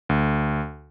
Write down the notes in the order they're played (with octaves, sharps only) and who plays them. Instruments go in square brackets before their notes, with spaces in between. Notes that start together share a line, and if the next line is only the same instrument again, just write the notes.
[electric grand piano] D2